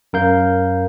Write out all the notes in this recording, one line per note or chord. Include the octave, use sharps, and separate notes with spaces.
F#2 A#4 F5 G6